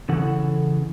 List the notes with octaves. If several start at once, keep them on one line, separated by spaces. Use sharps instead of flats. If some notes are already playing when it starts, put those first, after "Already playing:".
C#3 E3 E4 A4 F#5